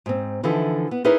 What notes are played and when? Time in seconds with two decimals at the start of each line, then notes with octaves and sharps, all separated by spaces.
0.06 G#2 C4
0.43 D3 E3 F3 D#4 E4 A4
0.91 B3
1.05 D#4 E4 G#4 A#4 B4 C#5